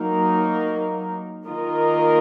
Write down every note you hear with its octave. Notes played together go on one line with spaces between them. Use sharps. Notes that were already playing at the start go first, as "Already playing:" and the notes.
Already playing: F#3 A#3 D#4 A#4
D#3 A#3 F4 A#4 D#5